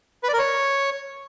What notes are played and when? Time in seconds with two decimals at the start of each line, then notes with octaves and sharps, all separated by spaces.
0.23 B4
0.28 D5
0.34 A#4
0.39 C#5